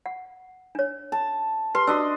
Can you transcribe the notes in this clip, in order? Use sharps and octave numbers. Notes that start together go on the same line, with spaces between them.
F#5
D4 C#5
A5
G4 B4 C6
D4 F#4 D#5 E6